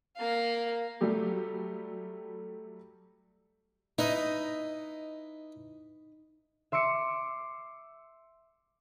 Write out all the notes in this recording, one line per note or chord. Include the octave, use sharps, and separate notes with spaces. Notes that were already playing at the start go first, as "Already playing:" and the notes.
A#3 F5
F#3 G3 A3 G4
D#4 E4 B4 D#5
E5 C6 D6 E6 C#7